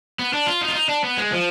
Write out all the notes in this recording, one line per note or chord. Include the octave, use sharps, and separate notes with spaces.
B3
D4
F4
D#4
F4
D#4
D4
B3
G#3
F3